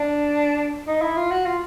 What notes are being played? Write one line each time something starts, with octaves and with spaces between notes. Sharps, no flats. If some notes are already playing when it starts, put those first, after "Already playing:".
Already playing: D4
D#4
E4
F4
F#4
F4